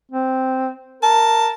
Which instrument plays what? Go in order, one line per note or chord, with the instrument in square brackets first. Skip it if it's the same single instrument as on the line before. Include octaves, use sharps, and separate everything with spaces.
[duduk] C4
[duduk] A#4 [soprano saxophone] A5